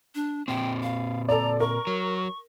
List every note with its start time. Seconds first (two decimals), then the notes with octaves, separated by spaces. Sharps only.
0.15 D4
0.48 A#2 C4 G5
0.83 F5
1.29 A4 D5 A#5
1.60 A#4 C#6
1.87 F#3